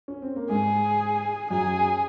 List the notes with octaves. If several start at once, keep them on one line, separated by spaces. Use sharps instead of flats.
C#4
C4
A#3
G#2 G#3 G#4
F#2 F#3 G#4